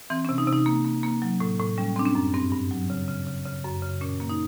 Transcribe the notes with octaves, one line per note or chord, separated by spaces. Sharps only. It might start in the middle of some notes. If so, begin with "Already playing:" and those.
E3 C4
C#4
C3
D#4
C3
D#4
A#3
A#3
A#3
F#3
A2
A2
G3 C#4
C4 D4
C#4
F#2
G2 C4
G2
F#3
C#3
C#3
C#3
C#3
F#2
C#3
A#2 C#4
A#3
D#4